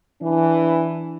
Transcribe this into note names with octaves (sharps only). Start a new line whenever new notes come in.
E3 D4